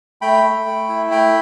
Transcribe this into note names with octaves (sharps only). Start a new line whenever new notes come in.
A3 G5 B5
A3
A3
E4
A3 G5 B5